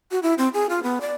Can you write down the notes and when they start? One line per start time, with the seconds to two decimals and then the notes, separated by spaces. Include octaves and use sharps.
0.11 F#4
0.23 E4
0.38 C4
0.54 G#4
0.69 F4
0.83 B3
1.01 D5